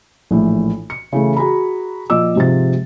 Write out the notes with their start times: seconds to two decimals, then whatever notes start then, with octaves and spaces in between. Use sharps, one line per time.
0.31 A#1 A2 E3
0.90 C#7
1.13 C#3 E3 A3
1.37 F#4 G#4 A#5 B5
2.10 A#2 F3 D#5 D6 E6
2.36 G#2 C3 F3 A6